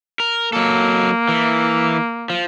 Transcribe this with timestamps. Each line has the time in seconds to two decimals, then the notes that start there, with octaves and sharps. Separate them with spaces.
0.20 A#4
0.53 F#3 A#3 A4
1.29 E3
2.30 F3